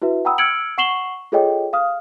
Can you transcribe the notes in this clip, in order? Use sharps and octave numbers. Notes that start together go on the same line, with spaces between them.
E4 F#4 B4 E5
F#5 G5 A#5 B5 D#6 E6
E6 F6 G#6 C#7 D7 F#7
F#5 C#6 C7 E7 F#7 G7
F4 G#4 A4 C#5 D#5 G5
F5 D#6 F6